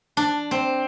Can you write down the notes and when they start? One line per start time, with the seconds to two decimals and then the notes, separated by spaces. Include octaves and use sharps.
0.17 D4
0.51 C4